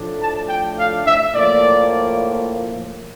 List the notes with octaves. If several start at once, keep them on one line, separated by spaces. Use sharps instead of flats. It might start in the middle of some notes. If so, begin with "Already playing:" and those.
Already playing: A2 F3 A3 D4
A5
G5
F5
E5
A2 F3 A#3 D5